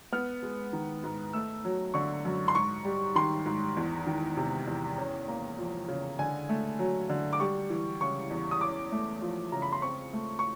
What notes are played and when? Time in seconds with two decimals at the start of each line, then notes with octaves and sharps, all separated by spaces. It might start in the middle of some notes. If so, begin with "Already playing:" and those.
0.12 B3 F6
0.43 G#3
0.73 D#3
1.04 G#2
1.33 A3 E6
1.65 F#3
1.94 D3 C#6
2.25 F#2
2.48 C6
2.55 G#2 C#6
2.85 G3
3.15 D#3 C6
3.46 G#2
3.77 E2
4.07 D#3
4.37 C3
4.67 E2
4.97 C#4
5.28 A#3
5.58 F3
5.88 C#3
6.19 D3 G#5
6.49 A3
6.79 F#3
7.10 D3
7.33 D6
7.40 G3 C#6
7.70 E3
8.01 C#3 C#6
8.30 E2
8.51 D#6
8.61 C#4 D6
8.92 A3
9.22 F3
9.52 C#3 A#5
9.62 B5
9.72 C6
9.82 C4 C#6
10.13 A3
10.39 C#6